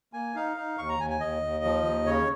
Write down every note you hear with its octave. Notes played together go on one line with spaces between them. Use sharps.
A#3 G#5
D#4 F5
D#4
D#2 C#6
A#5
D#2 G#5
G#5
D#2 D#5
D#2
F3
D#2
C#3 C#5